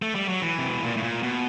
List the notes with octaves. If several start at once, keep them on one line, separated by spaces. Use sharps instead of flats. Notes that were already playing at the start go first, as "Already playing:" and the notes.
A3
G3
F#3
E3
C3
B2
A#2
A2
A#2
B2